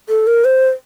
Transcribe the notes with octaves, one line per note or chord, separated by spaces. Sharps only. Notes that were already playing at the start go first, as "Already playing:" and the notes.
A4
A#4
C5